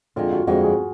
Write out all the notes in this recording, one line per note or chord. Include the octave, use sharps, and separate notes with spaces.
F2 D3 G#3 F4
F#4
F2 D3 G#3 F#4
G#4